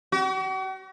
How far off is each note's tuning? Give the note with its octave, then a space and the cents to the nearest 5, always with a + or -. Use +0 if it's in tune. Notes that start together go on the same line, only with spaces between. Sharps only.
F#4 +45